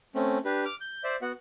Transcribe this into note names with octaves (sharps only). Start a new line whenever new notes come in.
A3 C4 C#4
D4 G4 B4
D6 F6
G6
C5 D5 E5
B3 F#4 F#5